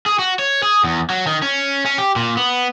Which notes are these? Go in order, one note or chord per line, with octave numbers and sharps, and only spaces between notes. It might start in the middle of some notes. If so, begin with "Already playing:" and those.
G#4
F#4
C#5
G#4
E2
F#3
D#3
C#4
C#4
G4
A#2
B3